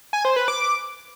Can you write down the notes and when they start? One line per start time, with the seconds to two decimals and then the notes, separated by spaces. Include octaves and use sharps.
0.13 G#5
0.25 C5
0.36 B4
0.48 D6